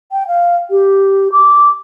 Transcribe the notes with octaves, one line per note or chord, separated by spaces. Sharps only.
G5
F5
G4
D6